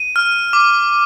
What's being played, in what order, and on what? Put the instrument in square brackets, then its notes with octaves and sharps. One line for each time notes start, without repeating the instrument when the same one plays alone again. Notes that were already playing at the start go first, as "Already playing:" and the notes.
Already playing: [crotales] D#7
F6
D6